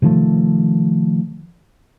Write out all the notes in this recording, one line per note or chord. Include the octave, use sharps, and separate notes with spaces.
C3 D#3 F3 A3